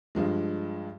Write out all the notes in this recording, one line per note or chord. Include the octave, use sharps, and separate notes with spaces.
G2 F3 G#3